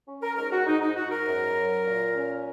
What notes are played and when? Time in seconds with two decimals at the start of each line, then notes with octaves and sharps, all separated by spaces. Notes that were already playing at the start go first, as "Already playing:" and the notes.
0.07 C#4
0.23 A#4
0.37 G#2 A#4
0.52 F#4
0.67 G#2 D#4
0.82 D#4
0.96 G#2 F#4
1.12 A#4
1.26 F#2
1.56 F#3
1.85 A#2
2.14 C#4